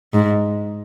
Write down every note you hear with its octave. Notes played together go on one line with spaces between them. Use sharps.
G#2